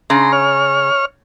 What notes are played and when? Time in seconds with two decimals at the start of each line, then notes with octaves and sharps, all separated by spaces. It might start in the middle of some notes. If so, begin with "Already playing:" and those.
0.10 C#3 A#5 C6
0.33 C#5 F6